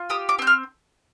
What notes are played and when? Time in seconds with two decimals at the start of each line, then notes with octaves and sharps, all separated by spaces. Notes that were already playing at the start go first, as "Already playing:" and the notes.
Already playing: F4
0.10 G4 D#6
0.29 D6
0.39 C4 G6
0.47 F6